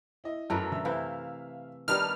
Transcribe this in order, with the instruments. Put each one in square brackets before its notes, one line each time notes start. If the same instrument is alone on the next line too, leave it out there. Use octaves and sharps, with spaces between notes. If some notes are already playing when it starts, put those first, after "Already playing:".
[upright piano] E4 D#5
[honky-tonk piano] F#2 [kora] A3 A#4 B4
[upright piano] D3 E5 E6
[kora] C3 E3 E4 [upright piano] E5 [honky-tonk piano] F5
[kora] D#3 G3 B3 [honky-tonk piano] D4 G4 A5 [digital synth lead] F6